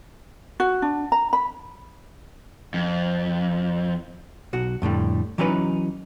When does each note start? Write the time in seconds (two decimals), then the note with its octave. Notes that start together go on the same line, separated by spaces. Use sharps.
0.60 F#4
0.82 D4
1.12 A#5
1.33 B5
2.74 F2
4.53 B1 F#4
4.82 F2 A2 D3 G3
5.38 E3 F#3 C#4 D#4 G#4 B4